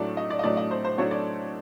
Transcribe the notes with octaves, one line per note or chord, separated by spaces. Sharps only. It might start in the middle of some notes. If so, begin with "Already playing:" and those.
Already playing: A2 F#3 A3 D4 D5
D#5
D5
D#5
A2 F#3 A3 D4 D5
D#5
C5
C5
A2 F#3 A3 D4 C#5
D5